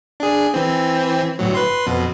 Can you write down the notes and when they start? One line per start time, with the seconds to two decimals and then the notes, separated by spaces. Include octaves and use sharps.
0.20 D4 G#4
0.54 E3 C4
1.39 G1 A2 F#3
1.55 B4 C6
1.87 F2 B2